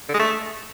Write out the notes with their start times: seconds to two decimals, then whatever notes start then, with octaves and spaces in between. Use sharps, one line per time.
0.09 D3
0.14 G#3
0.20 A3